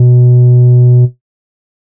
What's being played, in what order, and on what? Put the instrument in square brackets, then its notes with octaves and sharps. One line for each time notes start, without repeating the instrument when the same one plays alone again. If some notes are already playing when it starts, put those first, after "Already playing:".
Already playing: [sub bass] B2